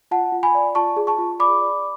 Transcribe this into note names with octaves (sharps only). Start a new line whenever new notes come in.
F4 F#5 A5
F4
G#5 B5
D5
F4 A5 C#6
G#4
A5 C#6
F4
D5 B5 D6
D5